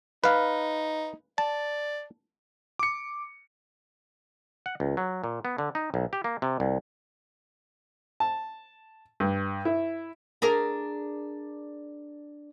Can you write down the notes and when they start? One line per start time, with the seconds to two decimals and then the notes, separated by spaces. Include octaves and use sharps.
0.24 D#4 B4 F5
1.38 D5 A5
2.79 D6 C#7
4.66 F#5
4.80 C#2
4.97 F#3
5.24 A#2
5.45 B3
5.58 D3
5.75 D#4
5.94 B1
6.13 G4
6.24 A#3
6.42 C3
6.60 C2
8.20 A5
9.20 G2
9.65 E4
10.42 D4 G#4 A#4